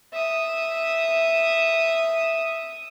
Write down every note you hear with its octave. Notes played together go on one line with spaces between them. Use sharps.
E5 D#6